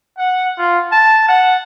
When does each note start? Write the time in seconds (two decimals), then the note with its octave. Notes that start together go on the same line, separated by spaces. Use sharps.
0.18 F#5
0.58 F4
0.92 A5
1.28 F#5